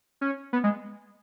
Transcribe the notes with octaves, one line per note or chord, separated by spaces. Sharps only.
C#4
B3
G#3